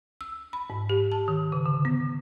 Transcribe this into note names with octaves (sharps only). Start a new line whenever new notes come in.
E6
B5
G#2
G4
A5
D#3
C#3
D3
B3